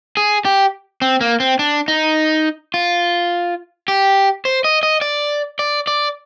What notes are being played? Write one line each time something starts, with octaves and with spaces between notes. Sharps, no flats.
G#4
G4
C4
A#3
C4
D4
D#4
F4
G4
C5
D#5
D#5
D5
D5
D5